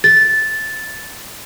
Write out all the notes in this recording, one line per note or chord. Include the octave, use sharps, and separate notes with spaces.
A6